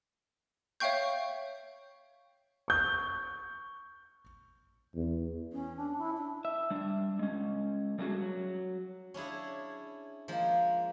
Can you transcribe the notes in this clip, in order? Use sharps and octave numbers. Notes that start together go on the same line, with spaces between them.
C#5 E5 F5 G5 C#6 G6
C#6 G6
E2
C#4
D4
E4
D4
E5
G3 D4
G#3 C#4
G3 A3 A#3 C#4 F#4 G#4
F#3
C#4 D4 E4 G#4
F3 G#3 A#3